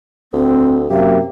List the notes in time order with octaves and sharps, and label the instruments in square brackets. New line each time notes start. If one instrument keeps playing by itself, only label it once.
[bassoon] D2 [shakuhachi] C4
[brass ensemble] F#2 C3 A#3 [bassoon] G4 [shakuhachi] E5